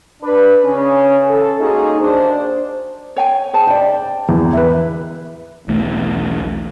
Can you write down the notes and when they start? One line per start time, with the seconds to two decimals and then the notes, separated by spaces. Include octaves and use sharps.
0.22 D4 B4
0.64 C#3 C#4
1.28 A4
1.59 G#3 A#3 C#4 D#4 F#4 G#4
2.00 D#2 D4 C5
3.16 C#5 G5 G#5
3.53 G#4 C5 A5
3.67 D5 G5
4.29 E2
4.53 B4 E5
5.67 E1 B1 E3 A3